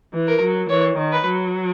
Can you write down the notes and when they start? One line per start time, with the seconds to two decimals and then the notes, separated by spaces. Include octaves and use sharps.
0.13 E3
0.27 A#4
0.42 F#3
0.69 E3 C#5
0.98 D#3
1.12 B4
1.27 F#3